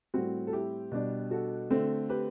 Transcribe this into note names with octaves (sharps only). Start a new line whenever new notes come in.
A2 G3 C4 F#4
A4
E4 G4
B2 G3 D4
F#4 A4
D3 A3 C4
G4 B4